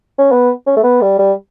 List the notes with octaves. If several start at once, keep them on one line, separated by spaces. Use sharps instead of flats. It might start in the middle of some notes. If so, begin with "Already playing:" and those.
C#4
B3
C#4
A3
B3
G3
G3